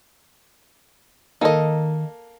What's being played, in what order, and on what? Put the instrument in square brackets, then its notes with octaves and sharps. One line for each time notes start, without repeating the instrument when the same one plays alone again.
[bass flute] D#3 [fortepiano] A#3 A4 [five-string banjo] D#4 D#5